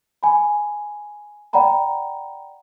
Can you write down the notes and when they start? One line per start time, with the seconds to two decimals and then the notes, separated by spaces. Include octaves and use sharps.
0.23 G#5 B5
1.53 D5 F#5 G5 A#5 B5